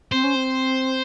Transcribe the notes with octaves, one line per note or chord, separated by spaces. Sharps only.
C4 C5
C#4
C4